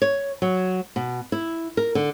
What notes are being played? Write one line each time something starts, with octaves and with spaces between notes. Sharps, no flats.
C#5
F#3
B2
E4
A#4
D3